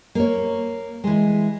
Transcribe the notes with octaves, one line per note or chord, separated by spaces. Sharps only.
A#3 C#5
E3 G#3